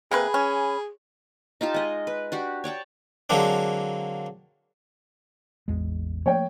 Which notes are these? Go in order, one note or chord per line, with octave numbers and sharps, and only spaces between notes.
C3 A#3 G#4 B4 B5
C#4
D#4 F4 G4 A5
G#3 D#5
B4
D4 F#4 G4
C#5 D5 G5 A5
D3 F#3 G#3 A#3 C4 D4
A1 E2 G#3
F3 A3 A#3 C#5 G5